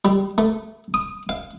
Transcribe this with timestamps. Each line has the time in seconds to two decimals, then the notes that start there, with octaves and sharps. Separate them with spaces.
0.05 G3
0.38 A3
0.94 D#6
1.29 F5